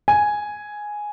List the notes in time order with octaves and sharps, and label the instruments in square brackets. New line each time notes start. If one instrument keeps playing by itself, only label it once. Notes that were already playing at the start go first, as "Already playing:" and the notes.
[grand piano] G#5